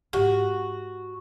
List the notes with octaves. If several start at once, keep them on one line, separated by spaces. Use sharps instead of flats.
G#2 E4 F#4 G4